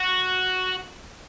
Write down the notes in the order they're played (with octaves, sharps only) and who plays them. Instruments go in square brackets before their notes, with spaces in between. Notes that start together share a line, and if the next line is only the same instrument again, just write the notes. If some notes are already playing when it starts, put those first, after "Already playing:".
Already playing: [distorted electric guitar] F#4